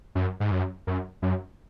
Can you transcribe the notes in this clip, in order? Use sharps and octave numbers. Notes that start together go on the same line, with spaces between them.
F#2
G#2
F#2
F#2
F#2